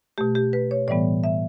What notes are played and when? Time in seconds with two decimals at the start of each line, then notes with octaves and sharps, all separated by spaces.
0.18 B2 A3 G4
0.35 G4
0.53 B4
0.71 C#5
0.88 A2 E3 G3 B3 D5
1.24 E5